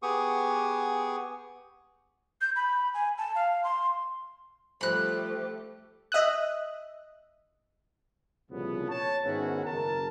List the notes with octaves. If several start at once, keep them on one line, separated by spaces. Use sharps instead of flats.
B3 G4 G#4 C#6 D#6
G6
B5
G#5
A5
F5
C6
F3 G3 A3 G4 C5 B5 F#6
D#5 E5 D#6 F#6
C2 A#2 C#3 F3 B3
C#5 A5
G#2 D#3 B3 C#4 E4 F#4
F#1 A#4 A5